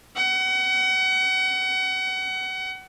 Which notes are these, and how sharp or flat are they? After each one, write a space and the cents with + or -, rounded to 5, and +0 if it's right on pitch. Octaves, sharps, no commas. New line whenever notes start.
F#5 +30